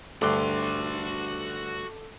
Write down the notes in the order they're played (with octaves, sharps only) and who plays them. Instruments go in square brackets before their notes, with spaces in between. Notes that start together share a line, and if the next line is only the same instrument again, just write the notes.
[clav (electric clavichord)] D2 G2 [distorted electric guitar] F#4 C6 [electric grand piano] A4 D6 F#6